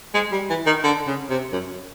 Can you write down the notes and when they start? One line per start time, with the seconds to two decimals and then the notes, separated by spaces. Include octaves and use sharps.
0.14 G#3
0.32 G3
0.49 E3
0.66 D#3
0.84 D3
1.07 C#3
1.30 C3
1.53 F#2